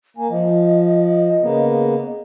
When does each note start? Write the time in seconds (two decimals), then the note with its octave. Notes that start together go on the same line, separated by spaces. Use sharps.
0.17 A#3 G#5
0.30 F3 D#5
1.42 C#3 A#3 B3